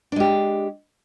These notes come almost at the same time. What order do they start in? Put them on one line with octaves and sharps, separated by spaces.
D4 G#3 G4